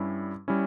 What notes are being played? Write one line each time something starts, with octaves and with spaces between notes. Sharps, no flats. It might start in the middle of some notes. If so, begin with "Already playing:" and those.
Already playing: G2 G3 C#4 E4
G3 C#4 E4